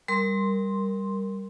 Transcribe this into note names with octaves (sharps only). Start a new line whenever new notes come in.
G3 A#4 C6